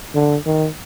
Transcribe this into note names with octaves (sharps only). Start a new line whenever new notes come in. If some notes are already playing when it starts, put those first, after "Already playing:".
D3
D#3